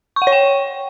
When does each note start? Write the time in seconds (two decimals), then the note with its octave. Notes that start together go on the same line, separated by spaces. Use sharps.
0.16 C#6
0.22 F#5
0.27 C#5
0.32 G5